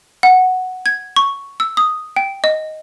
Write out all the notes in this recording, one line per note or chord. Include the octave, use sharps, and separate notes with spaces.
F#5
G#6
C#6
E6
D#6
G5
D#5